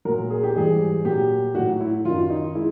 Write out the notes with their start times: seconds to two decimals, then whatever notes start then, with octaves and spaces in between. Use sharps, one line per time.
0.05 A#2 F#3 A#4
0.30 G#4
0.43 G4
0.56 G#2 E3 G3 G#4
1.05 A#2 F#3 G4
1.55 A2 F#3 F#4
1.80 E4
2.05 F#2 D#3 F#3 F4
2.30 D#4
2.55 G#3 E4